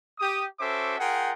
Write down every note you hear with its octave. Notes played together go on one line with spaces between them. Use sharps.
G4 D#6
C#4 F#4 A4 C5 E5 D6
F4 G#4 A#4 F#5 G5